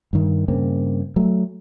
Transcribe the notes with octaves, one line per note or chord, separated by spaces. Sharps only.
G2 D#3
G2 C#3 A#3 C4
F#3 A3